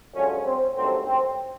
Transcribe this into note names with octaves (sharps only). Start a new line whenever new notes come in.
F#2 D3 F3 G#3 C#4
C4
G#1 G2 D#3 F#3 A3 C4
C4